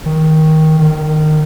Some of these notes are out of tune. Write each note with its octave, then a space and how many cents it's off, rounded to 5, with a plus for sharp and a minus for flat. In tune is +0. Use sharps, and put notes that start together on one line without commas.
D#3 +15
D#3 -20